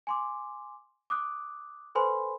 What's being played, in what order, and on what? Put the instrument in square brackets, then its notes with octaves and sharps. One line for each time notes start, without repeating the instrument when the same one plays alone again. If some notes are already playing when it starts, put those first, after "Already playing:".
[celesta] G#5 C6 D6
D6 D#6 F#6
A4 B4 C5 G#5 B5 C6